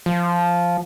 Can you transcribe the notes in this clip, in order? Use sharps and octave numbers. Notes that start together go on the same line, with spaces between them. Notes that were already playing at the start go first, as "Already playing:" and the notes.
F3